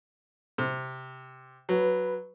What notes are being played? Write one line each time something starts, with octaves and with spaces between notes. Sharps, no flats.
C3
F#3 B4